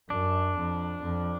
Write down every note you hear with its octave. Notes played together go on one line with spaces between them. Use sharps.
F#2 D4
F2
F2